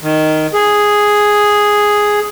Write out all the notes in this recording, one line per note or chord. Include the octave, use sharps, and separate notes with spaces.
D#3
G#4